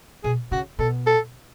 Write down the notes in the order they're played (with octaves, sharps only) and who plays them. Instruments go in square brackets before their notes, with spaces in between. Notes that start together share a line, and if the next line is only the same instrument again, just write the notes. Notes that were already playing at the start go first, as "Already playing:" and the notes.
[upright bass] B2 [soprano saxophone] G#4
[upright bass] C#3 [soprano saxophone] F#4
[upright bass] B2 [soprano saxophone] A4
[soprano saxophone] A4